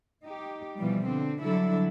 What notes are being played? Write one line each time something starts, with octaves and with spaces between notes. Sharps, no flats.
D#4 G4
B2 E3 F3 G3
D3 C4
D3 F#3 G3 E4 A4